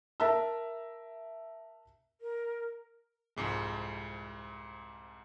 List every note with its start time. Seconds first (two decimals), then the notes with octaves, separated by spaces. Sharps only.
0.20 A#4 E5 A5 A#5 E6
2.21 A#4
3.36 C2 F2 G#2 G#3